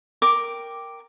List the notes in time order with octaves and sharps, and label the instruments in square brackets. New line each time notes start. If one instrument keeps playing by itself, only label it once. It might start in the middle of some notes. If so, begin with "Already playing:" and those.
[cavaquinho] A#4 G5 D6